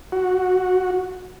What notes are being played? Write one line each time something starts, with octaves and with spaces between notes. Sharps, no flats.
F#4